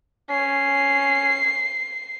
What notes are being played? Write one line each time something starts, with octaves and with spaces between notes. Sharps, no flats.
C#4 C7